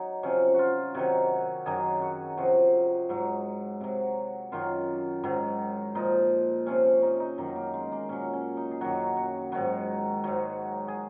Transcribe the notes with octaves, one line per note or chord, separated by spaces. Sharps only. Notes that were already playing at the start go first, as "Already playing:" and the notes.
Already playing: F#3 D#4
C3 F3 C#4
F4 F#4
C3 D#3 F#3 F#4
F#2 D#3 F#3 G#4
F#4
C3 F3 F#4
G#2 F#3
C3 F#3
F#2 D#3 F#3 F4
G#2 D#3 F#3
A#2 F3 D#4
C3 F3 C#4
C#4
D#4
D#4
F#2 D#3 F#3 D#4
A#3
G#3
A#3
A#2 F#3 C#4
C#4
D#4
G#4
F#2 D#3 F#3 F#4
F#4
G#2 D#3 F#3 F#4
G#2 F#3 F#4
G#4